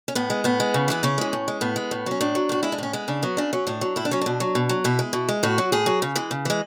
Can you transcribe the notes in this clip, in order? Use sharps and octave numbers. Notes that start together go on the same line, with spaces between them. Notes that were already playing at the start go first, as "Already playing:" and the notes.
C#4
A2 B3
G#3
A2 B3
G#3
C#3
E3 G#3 B3
C#3 C#4
E3 G#3
A2
G#3
A2 B3
G#3
A2
F#3 C#4
A2 D4
F#3
A2 F#4
G#3 E4
D4
A2 C#4
G#3 B3
C#3 D4
F#3 B3
C#3 D4
F#3 C#4
A2 D4
F#3
A2 E4
D4
F#3 C#4
B2 D4
F#3
B2
F#3
B2 E4
G#3
B2
G#3
A2 F#4
F#3
A2 G#4
F#3
C#3
E3 G#3
C#3
E3 G#3